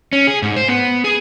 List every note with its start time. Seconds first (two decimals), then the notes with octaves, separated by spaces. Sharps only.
0.13 C#4
0.27 G#4
0.42 G#2
0.56 C5
0.69 B3
1.04 G#4